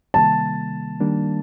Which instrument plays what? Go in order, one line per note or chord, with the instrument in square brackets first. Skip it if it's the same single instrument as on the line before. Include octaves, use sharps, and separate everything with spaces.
[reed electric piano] C3 D#3 G3 A#3 [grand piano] A5
[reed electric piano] D#3 G3 A#3 D4